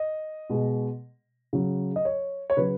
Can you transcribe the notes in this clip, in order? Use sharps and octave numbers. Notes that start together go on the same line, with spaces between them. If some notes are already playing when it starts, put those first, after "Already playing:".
Already playing: D#5
B2 G#3
C#3 F#3
D#5
C#5
C#5
C#3 F#3 B4